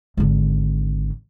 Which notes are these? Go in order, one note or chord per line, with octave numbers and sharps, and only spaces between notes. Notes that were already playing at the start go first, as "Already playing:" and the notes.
G#1 D3